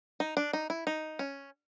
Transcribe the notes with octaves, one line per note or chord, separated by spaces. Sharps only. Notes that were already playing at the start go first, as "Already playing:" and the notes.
D#4
D4
D#4
E4
D#4
C#4